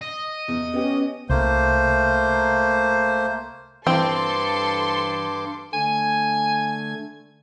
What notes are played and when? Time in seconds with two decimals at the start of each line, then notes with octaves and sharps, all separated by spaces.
0.02 D#5
0.48 E2
0.74 B3 C#4 G4
1.29 C2 A3 A#3 C5
3.87 G2 E3 C4 A4 C6 D6
5.73 D3 A3 G#5 G#6